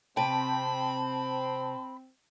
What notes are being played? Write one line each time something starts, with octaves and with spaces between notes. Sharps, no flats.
C3 C4 G5 A5 B5